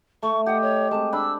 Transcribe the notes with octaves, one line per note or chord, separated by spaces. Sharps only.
A3 C#6
G4 D#5 F#5
C#5
G#3 C4 A5
D4 B5 E6